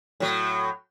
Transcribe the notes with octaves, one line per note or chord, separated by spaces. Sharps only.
A2 F#3